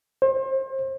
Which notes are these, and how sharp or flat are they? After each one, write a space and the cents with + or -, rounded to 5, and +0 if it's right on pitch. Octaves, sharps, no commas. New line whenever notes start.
C5 +35